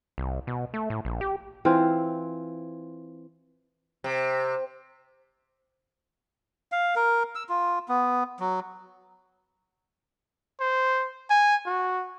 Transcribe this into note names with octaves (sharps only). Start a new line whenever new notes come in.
C2
B2
A3
A2
A#1
G4
E3 C4 F4
C3
F5
A#4
E6
F4
B3
F#3
C5
G#5
F#4